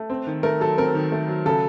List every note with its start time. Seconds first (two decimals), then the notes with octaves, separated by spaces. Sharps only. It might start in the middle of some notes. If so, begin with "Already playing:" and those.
Already playing: A3
0.10 C4
0.27 D#3
0.43 A3 A#4
0.60 F#3 A4
0.78 C4 A#4
0.95 D#3
1.12 A3
1.28 F#3
1.46 C#3 A4